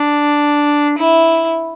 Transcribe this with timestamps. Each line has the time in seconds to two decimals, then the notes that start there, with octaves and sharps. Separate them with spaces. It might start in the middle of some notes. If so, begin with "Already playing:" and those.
Already playing: D4
0.98 E4